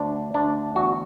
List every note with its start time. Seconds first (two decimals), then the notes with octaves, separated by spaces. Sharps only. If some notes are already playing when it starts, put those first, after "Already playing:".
Already playing: D2 D4
0.34 D2 D4
0.75 E2 F#4